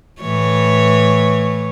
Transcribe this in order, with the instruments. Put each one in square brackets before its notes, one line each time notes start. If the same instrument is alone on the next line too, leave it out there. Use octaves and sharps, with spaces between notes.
[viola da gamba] A2 E3 C#5